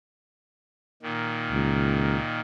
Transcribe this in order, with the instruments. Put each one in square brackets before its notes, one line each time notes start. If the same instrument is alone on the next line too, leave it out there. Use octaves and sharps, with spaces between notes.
[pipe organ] A#2 D#3
[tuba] C#2